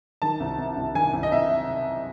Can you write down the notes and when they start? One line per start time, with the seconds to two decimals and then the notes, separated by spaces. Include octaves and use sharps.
0.22 D#3 A5
0.40 C2
0.58 C3
0.77 C2
0.95 D#3 G#5
1.13 C2
1.23 D#5
1.32 C3 E5